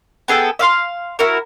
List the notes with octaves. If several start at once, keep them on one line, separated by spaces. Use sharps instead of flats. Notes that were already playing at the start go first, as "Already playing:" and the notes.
B3 G#4 A4 G5
E5 F5 C6
E4 F#4 A#4